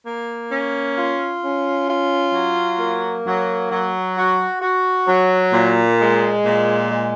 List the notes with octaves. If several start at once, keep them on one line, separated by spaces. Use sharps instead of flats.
A#3
C#4
F4
C#4
F4
F#3
A#3
F#3
F#3
F#4
F#4
F#3
A#2
G#3
A#2
G#3